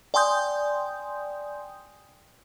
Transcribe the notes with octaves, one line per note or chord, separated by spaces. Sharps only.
D5 G5 G#5 C6 D#6 G6